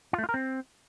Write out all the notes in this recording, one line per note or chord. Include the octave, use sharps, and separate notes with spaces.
F4
A3
F4
A#4
C4